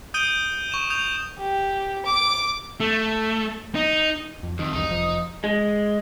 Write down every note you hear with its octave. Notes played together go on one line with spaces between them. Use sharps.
D#6 G6 D7 D#7 G7
C#6 E7
D#6 G6 F7
G4
D6
A3
D#4
F2
C2 F2 D#3
B1 E2 G2 D#4
F1 F3
G#3